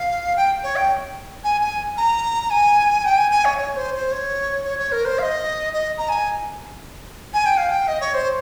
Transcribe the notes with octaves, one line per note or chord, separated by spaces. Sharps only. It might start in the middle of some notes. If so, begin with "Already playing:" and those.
Already playing: F5
G5
C#5
G5
G#5
G#5
A#5
G#5
G5
G#5
G#5
C#5
C#5
C5
C5
C#5
C#5
C#5
A#4
C5
F5
D#5
D#5
A#5
G#5
G#5
G5
F5
G5
D#5
C#5
C5